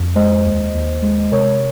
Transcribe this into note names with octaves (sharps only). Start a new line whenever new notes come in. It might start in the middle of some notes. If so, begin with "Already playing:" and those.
Already playing: F2
G#3 C5 D#5
D#2
D#2
G#3
C3 A#4 C#5